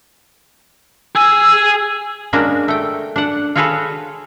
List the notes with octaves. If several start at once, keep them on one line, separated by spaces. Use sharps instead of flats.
G#4 G#5 E6
G#3 A#3 C#4 D4 F#4
A3 G5
D4 F#5
F4 F#4 G#4 A4 B4 C#5